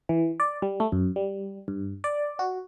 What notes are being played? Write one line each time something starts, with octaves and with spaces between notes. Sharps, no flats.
E3
D5
G3
A3
F#2
G3
G2
D5
F#4